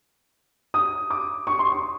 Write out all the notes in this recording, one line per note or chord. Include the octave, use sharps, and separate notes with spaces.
D#6
D6
C#6
C6
C#6